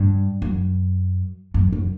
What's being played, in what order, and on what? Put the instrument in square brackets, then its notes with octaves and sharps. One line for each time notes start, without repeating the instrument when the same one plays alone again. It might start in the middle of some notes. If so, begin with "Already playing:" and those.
Already playing: [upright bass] G2
F#2
F#2
F#2